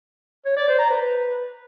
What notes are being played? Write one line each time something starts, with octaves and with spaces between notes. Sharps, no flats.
C#5
D5
C5
A#5
B4